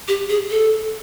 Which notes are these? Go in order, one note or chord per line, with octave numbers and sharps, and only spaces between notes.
G4
G#4
A4